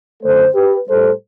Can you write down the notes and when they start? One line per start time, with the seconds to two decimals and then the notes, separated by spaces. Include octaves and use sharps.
0.22 F#2 D3 A3 A4 C5
0.55 G4 B4
0.87 A2 G3 A4 C5